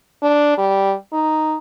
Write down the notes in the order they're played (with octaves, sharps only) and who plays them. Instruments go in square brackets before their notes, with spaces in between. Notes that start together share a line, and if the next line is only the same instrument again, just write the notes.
[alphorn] D4
G3
D#4